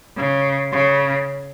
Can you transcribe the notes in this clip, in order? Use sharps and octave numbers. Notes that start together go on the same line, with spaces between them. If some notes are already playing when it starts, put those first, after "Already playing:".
C#3
C#3